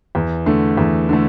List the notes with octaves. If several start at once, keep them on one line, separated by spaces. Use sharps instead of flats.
E2
D3 A3
E2
D3 A3